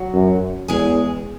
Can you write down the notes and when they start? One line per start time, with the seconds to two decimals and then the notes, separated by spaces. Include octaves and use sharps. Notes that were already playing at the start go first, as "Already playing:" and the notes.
Already playing: F#3 F#4
0.14 F#2
0.68 E2 G#3 G#4